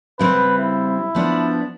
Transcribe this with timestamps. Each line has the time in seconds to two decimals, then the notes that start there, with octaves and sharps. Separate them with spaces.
0.19 C#3 G3 C4 B4
0.58 E4
1.15 F3 B3 D4